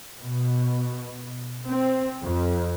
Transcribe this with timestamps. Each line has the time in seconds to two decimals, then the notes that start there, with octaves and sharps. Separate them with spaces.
0.21 B2
1.69 C4
2.24 F2